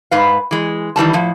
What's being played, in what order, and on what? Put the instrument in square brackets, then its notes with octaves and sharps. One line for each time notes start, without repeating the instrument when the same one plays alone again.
[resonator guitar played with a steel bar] G#2 B4 F5
E3 G#3
D#3 E3 G3 A5
A2 F3